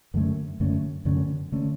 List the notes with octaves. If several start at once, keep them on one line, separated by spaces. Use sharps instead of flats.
F#2 D3 A3 C#4
F#2 D3 A3 C#4
F#2 D3 A3 C#4
D3 A3 C#4